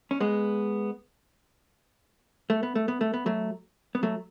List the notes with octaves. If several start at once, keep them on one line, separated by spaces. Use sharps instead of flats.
C#4
G#3 B3
A3
B3
A3
B3
A3
B3
F#3 A3
B3
F#3 A3